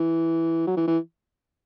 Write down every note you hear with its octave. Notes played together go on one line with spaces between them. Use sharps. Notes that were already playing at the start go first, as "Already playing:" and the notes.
Already playing: E3
F#3
E3
E3